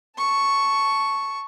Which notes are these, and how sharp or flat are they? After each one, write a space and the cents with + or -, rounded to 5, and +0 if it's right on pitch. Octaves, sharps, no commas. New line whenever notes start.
A5 +0 C#6 +0